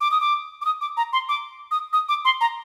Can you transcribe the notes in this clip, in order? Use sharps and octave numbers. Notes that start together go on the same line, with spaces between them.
D6
D#6
D6
D6
D#6
D6
A#5
C6
D6
D#6
D#6
D6
C6
A#5